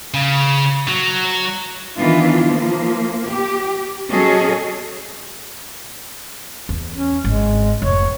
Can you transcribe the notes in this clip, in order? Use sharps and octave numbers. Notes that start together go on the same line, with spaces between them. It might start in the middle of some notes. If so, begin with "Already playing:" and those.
C#3
F#3
D#3 E3 B3 D4 E4 F4
F3 A#3
G4
F#3 C#4 G#4 A4 D#5
E2
C#4
G#1 G#3
F1 C#5